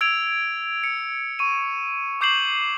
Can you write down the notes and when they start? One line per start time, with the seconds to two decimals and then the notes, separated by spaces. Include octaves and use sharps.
0.01 E6 G#6 D7 F7
0.84 C#7
1.39 C#6 D#7
2.21 C#6 D6 G6 C7 E7 F#7